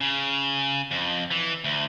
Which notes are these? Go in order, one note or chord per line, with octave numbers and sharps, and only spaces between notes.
C#3
F2
E3
D2